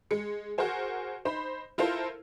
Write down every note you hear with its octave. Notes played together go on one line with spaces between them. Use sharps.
G#3 C#7
F#4 G#4 A#4 C5 G#5
D#4 C5 B5
E4 F4 A4 A#4 C5